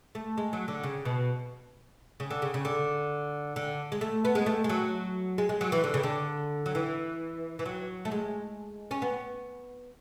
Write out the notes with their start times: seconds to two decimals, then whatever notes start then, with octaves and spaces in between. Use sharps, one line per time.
0.15 A3
0.37 G#3
0.53 F#3
0.68 D3
0.83 C#3
1.05 B2
2.20 C#3
2.30 D3
2.42 C#3
2.54 C#3
2.65 D3
3.56 D3
3.92 G#3
4.01 A3
4.25 B3
4.35 G#3
4.46 A3
4.64 G#3
4.69 F#3
5.38 G#3
5.49 G#3
5.61 F#3
5.72 E3
5.84 D3
5.94 C#3
6.03 D3
6.66 F#3
6.75 E3
7.59 E3
7.65 F#3
8.05 A3
8.11 G#3
8.91 C#4
9.02 B3